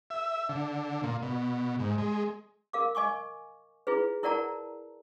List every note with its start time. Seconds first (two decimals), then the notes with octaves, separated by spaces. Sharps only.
0.10 E5
0.49 D3
1.03 A#2
1.23 B2
1.79 G#2
1.98 G#3
2.73 A#4 F5 D6
2.95 D#5 G#5 C#6 D6
3.87 E4 F4 G#4 B4
4.23 E4 A#4 D5 F#5 A5 A#5